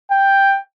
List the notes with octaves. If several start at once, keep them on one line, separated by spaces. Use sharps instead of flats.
G5